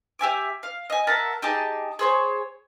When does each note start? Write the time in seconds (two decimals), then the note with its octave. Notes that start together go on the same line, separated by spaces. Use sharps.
0.19 G4 E5 G#5 D6
0.63 F5
0.90 D#5 G#5
1.07 A#4 E5 F#5 A5
1.42 D#4 G4 G#4 A5
1.99 G#4 C5 C#5